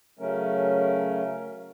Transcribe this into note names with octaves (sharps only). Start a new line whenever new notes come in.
C#3 F#3 A3 C#4 A#4